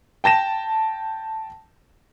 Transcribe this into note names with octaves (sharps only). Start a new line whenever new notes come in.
G5 A5 A#6 E7